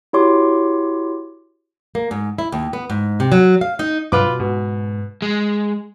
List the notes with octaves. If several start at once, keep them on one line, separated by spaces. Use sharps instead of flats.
E4 F#4 G4 C#5 C6 D6
A#3
G#2
E4
D#2
B3
G#2
C3
F#3
F5
D#4
G2 C3 F#3 F4 B4 D6
B2
G#2 B2
G#3